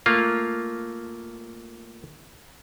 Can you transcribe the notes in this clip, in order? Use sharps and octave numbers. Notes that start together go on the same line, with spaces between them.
A3 A#3 F4